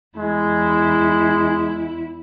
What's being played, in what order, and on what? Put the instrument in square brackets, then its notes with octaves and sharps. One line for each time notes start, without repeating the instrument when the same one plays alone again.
[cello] E2 E4 [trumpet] G#3